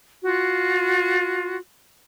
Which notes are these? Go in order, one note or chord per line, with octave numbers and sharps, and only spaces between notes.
F4 F#4